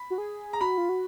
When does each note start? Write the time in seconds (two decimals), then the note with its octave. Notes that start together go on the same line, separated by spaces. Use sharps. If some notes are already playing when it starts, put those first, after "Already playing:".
Already playing: B5
0.10 F#4
0.18 G#4
0.53 A#5
0.61 F#4 B5
0.78 F4
0.89 F#4